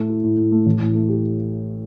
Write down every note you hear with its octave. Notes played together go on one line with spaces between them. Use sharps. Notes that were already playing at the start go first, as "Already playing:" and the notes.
Already playing: A2 A3
E4
A2
A2
A3
A1
A2
A3
G4